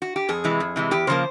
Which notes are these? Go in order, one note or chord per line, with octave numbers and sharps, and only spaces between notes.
F#4
G4
F2 G#4
C3 E3 G#3
F2
C3 E3 G#3
E2 G4
C#3 F3 A#3 C5